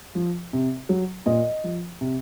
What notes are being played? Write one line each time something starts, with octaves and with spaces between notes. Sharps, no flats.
F3
C3
F#3
A#2 D#5
F3
C3